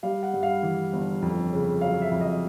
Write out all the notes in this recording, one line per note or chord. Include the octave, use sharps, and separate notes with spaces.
G3 F5
F#5
G2
F5
E3
G1
F2
C#3
F#3 F5
E5
F2
D#5